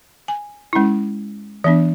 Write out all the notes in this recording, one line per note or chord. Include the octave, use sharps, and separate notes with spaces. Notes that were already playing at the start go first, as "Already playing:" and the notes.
G#5
G#3 C#4 E4
E3 B3 D4 E5